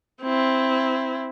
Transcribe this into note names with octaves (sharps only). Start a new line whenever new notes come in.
C4 E4